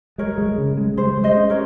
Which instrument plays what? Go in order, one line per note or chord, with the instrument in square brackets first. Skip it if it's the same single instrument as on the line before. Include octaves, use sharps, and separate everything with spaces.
[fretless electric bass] G#3 [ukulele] A#4 C#5
[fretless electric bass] G#3
C#3
G#3
[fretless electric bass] G#3 [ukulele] C5
[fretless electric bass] G#3
[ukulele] C5 D#5
[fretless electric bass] C#4
[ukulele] A#4 C#5